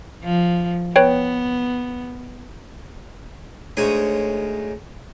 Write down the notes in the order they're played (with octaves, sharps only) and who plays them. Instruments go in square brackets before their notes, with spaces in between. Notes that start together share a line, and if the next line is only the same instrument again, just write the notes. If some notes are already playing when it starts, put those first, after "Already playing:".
[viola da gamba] F3
[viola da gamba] B3 [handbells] B4 C#5 G5
[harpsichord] D2 G#3 D#4 C#5 D#6